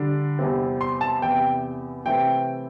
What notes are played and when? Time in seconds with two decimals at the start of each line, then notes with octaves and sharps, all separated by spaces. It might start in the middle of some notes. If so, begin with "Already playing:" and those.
Already playing: D3 G3 D4
0.39 E2 C3 G3 C4
0.81 C6
1.01 A5
1.22 E2 C3 E3 G5
2.06 C3 E3 A3 C4 G5